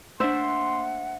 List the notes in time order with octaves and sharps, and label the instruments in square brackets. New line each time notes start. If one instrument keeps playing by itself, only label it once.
[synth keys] A3 A#3 D4 [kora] C5 E5 [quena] F#5 [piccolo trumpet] C6